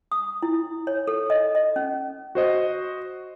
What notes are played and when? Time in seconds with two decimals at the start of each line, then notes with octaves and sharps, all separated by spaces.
0.12 D#6
0.42 E4
0.87 C#5
1.07 A4
1.30 D#5
1.55 D#5
1.76 C#4
2.35 F#4 C5 D#5